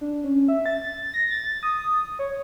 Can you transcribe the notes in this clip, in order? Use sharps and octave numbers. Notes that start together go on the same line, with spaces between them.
D4
C#4
E5
A6
A#6
A6
D#6
C#5